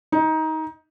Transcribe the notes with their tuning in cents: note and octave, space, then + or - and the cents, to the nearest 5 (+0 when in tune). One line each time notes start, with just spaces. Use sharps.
D#4 +20